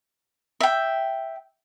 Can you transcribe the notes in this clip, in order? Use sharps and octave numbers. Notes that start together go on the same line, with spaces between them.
E5 G5